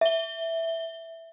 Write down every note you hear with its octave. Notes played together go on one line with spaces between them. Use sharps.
E5 G7